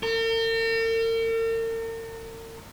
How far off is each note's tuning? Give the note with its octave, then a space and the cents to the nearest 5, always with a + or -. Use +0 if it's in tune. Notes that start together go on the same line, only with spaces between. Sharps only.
A#4 -45